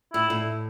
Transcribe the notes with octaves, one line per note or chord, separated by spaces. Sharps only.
A2 E4
A2